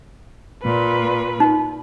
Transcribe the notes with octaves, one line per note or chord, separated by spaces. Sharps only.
A#2 B4
D#4